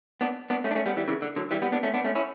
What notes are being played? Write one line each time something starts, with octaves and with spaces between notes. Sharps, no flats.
B3 D4
B3 D4
A3 C#4
D4
A3 C#4
G3 B3
E3 G3
C#3 E3
D3
D3 F#3
E3 G3
G3 B3
B3 D4
A3 C#4
B3 D4
A3 C#4
C#4 E4